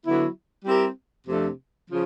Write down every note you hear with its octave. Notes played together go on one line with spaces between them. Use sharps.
D3 F#3 B3 E4
G3 C4 E4 G4 A#4
F2 C3 F3 A3 D4
C#3 F3